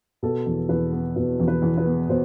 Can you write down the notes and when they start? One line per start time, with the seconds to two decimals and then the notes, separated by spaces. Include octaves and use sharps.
0.23 B2 A4
0.46 E2
0.69 E2 B4
0.92 B3
1.16 B2 B4
1.40 E2
1.48 B4
1.62 E2
1.78 B4
1.86 B3
2.09 B2 C5